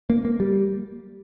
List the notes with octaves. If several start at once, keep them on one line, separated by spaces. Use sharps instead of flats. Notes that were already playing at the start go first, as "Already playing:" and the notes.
A#3
A#3
G3